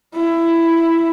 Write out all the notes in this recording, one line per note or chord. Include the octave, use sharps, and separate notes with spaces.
E4